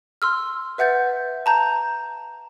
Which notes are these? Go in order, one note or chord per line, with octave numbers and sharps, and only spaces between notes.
C6 E6 F6
B4 E5 F#5 G6 A6
A5 A#5 G6